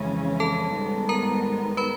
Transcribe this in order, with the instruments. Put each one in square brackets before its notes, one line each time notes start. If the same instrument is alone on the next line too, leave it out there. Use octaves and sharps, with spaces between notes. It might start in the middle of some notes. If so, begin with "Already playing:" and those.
Already playing: [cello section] F2 C#3 E3 G#3 C#4
[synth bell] A4 A5
[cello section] G#2 D#3 G3 B3
[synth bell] A#4 A#5
B4 B5